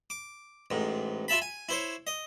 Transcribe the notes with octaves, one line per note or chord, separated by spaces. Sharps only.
D6
A1 G#2
F4 E5 A5 B5
G#5
E4 C5 C#5
D#5